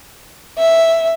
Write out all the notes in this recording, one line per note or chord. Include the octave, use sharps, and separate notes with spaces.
E5